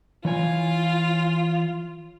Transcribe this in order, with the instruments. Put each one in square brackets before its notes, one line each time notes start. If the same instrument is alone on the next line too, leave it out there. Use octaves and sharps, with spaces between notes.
[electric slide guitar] E3 C#5 G#5 [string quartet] F4